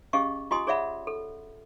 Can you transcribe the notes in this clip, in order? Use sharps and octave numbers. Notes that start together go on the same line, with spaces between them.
C#4 G4 G#4 D#5 F5 C#6
F4 G4 D#5 G#5 C6 D#6
G#4 C#5 D5 E5 F#5 B5
A4